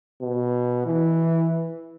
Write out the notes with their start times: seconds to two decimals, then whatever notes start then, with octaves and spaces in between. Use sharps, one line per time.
0.22 B2
0.86 E3